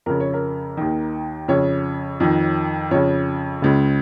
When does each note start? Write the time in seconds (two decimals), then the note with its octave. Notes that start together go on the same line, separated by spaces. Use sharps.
0.06 F2 C#3 A#4
0.20 C#5
0.34 A#4
0.77 D#2 D#3
1.48 F2 C#3 C#5
2.20 F2 D#3
2.91 F2 C#3 C#5
3.62 C#2 C#3